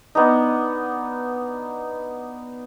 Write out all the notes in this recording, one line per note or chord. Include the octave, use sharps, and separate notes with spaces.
B3 D4 D#4